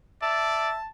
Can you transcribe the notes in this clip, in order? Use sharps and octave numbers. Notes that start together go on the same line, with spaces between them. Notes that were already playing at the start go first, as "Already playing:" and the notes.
D5 E5 A5